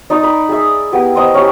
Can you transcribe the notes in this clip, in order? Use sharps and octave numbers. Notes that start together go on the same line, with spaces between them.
D#4 D5 C6 D#6
B5
G#4 E5
B3 E4 G4 B4
C5 D#5 A#5
C#4 E4 G4